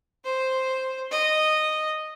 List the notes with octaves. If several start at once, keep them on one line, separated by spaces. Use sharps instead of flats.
C5
D#5